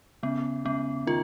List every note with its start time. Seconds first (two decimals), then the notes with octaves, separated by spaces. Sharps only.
0.23 C#3 B3
0.65 C#3 B3
1.07 D#3 F4